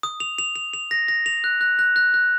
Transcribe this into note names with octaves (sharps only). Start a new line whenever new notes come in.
D#6
F7
F7
F7
F7
A#6
A#6
F7
F#6
F#6
F#6
F#6
F#6